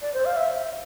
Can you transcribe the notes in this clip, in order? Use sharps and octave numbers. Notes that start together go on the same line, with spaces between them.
D5
C5
F5
E5